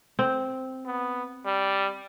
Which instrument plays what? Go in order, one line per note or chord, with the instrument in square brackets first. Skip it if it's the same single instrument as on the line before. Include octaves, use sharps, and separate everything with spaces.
[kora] C4
[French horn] B3
G3